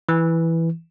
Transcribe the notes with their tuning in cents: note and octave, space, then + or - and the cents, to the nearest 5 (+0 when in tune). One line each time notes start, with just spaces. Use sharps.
E3 +0